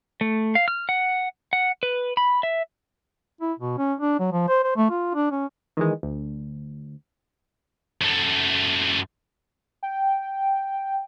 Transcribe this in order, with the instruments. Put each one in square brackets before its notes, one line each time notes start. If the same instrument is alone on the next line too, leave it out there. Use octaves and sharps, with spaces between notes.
[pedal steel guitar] A3
F5
F6
F#5
F#5
B4
B5
E5
[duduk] E4
B2
C#4
D4
F#3
F3
C5
C5
A3
F4
D4
C#4
[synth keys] D#3 E3 G#3
D2
[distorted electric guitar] F#2 A3
[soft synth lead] G5